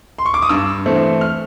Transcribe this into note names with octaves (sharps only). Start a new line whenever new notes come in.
C6
C#6
D6
D#6
G2 E6
E3 A3 C4
F6